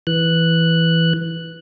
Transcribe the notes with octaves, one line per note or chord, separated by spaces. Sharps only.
E3 F#6